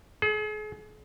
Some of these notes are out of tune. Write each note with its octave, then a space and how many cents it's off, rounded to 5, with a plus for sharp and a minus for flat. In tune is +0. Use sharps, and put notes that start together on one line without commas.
G#4 +40